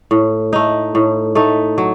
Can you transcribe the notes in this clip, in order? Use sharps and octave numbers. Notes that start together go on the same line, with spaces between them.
A2
A3 D#4
A2
A3 D#4
F#3